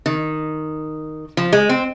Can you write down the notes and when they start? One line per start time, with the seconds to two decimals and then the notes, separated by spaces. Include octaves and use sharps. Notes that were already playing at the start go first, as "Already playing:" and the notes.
0.06 D#3
1.37 F3
1.53 G#3
1.69 C4